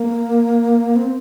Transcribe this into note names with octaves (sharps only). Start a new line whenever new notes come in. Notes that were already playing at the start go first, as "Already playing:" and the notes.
Already playing: A#3
C4